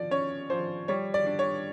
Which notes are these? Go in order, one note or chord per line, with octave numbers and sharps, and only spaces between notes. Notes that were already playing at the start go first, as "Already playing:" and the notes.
Already playing: F3 D5
C#4 C#5
F3 C5
G3 C#5
D5
D4
C#5